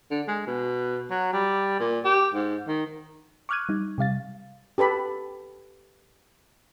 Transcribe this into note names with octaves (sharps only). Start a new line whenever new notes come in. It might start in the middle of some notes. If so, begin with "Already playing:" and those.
D3
G#3
B2
F#3
G3
A#2
G4
G#2
D#3
C#6 D6 F6 F#6 G#6 D#7
G3 D#4
C3 G3 F5 A6
G4 A4 B4 B5